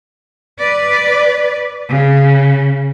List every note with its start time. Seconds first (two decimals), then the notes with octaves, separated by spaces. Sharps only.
0.59 B4 D5
1.89 C#3